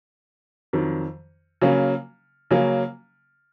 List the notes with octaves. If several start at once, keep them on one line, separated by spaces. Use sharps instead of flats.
F2 D#3 F#3
C#3 F#3 A#3 C#4
C#3 F#3 A#3 C#4